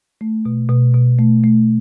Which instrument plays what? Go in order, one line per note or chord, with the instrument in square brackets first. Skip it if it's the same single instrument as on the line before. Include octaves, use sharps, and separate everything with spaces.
[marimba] A3
B2
B2
B2
A3
A3